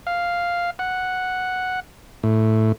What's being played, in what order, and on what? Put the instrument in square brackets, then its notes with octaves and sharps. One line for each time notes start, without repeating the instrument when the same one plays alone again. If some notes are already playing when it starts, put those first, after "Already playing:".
[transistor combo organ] F5
F#5
A2